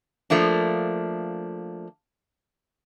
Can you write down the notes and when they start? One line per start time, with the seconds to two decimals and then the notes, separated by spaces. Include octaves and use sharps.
0.30 F3 A3 A#3 D4